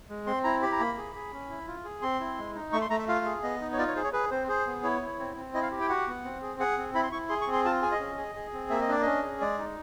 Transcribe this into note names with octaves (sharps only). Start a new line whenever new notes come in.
G#3
C4 C6
E4 A#5
G4 B5
A#5
A#3 B5
G#4
G#4
C#4
E4
F4
G#4
C4 C6
E4
G#3
D#4
A3 C#6
C6
A3 A#5
E5
F4 F5
G#4
B3 D#5
D#4
C#5
F4 D5
C#5
G#4 C5
C#5
G#4 B4
C4 C5
G#4 C5
B3
E4 C#5
E4
C4
C4
E4 D#5
F5
G4
G5
F#4 F#5
B3
C4
G#4
G#4 F#5
C4
E4 B5
C6
E4 C#6
G#4 C6
C#6
C4
C6
F4 A5
G#4 G#5
D#5
C#4
G#4
G#4
C4
A#3 E5
D#5
D4 D5
C#4 D#5
G#4
G#3 D5
D#4